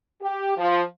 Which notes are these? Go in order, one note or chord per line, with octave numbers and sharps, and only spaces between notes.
G4
F3